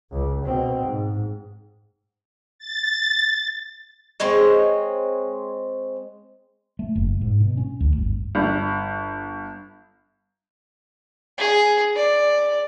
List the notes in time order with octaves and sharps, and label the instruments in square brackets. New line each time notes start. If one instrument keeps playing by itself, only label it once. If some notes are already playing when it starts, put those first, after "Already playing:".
[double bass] C#2
B2 C4
G#2
[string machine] A6
[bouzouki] G#3 C4 C#5 D#5
[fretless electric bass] A3
F#1
G#2
B2
C#4
D2
G1
[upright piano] G1
[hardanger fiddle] G#4
D5